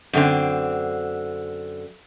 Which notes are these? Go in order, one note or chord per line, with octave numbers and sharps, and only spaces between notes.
F#2 D3 C4